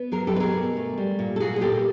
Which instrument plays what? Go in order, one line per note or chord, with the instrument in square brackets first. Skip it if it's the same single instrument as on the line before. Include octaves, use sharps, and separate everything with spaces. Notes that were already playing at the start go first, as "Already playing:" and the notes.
Already playing: [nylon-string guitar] B3
F#3 G#4 A#4
G4 A4
B2 B4
G#4 A#4
B2
A3
G3
A#2
A4
A#2 F#4 G#4
G#4
A#3 G4 A4